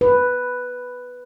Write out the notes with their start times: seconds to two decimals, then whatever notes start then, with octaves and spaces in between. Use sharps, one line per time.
0.01 B4